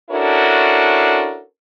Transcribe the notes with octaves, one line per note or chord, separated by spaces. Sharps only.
C#4 D4 E4 F#4 A4 A#4